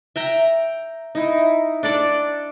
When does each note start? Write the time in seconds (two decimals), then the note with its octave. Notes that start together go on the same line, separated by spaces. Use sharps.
0.16 E5 G5 A#5
1.15 D#4 E4
1.83 D4 A4 D5 D6